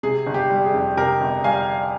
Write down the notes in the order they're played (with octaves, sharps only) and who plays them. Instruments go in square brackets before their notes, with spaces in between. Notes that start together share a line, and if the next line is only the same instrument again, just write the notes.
[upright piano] C3 G#4
G1
G4
G3
G#4
F2
C3 G4 A#4
G1
G3 F5 G#5